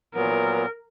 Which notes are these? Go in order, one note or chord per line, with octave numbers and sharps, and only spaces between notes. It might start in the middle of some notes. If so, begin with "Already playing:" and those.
A#2 F#3 B3 A#4